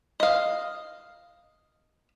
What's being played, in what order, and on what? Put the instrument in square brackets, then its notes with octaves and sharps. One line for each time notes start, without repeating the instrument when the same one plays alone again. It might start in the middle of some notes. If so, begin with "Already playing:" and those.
[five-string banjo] D#5 F5